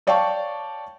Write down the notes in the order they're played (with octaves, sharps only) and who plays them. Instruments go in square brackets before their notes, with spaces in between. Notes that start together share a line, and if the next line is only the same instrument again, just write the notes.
[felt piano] C#5 D5 F5 G5 A5 C#6